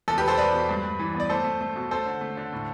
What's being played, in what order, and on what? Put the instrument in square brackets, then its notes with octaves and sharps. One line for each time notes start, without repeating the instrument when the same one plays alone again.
[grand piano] E2 A4
G4 B4
E2
A4 C5
E2 B4 D5
B2
G2
G2
E3
B3
D5
A3 A4 C5
A3
A3
B2
A3 A4 C5
D3
A3
D3
A2